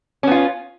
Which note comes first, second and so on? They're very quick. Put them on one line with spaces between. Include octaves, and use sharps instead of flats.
C#4 B3 F4